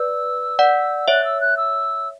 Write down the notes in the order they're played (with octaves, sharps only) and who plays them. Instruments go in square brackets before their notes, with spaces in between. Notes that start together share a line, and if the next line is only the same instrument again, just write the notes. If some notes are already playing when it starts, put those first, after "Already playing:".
Already playing: [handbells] B4 D5 [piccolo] E6
[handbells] D5 F#5
[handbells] C#5 E5 [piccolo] F#6
[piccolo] E6
F#6
E6